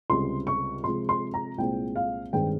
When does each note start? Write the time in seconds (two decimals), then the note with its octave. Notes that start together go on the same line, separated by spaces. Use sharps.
0.10 C#2 C3 G3 C6
0.47 C#6
0.84 C3 F3 G#3 C6
1.09 C6
1.34 A#5
1.58 C2 A#2 G#3 C4 G5
1.96 F5
2.33 G2 D#3 G#3 C4 G5